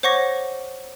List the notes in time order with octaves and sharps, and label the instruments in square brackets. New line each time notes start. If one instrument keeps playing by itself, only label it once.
[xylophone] C5 C#5 F#5 C#6 D6 A#6